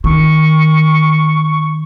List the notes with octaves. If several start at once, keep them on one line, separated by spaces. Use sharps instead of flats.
D#3 C#6